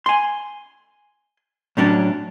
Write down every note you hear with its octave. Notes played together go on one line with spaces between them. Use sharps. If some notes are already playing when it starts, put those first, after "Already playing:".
G#5 C6
A2 F#3 C#4 D4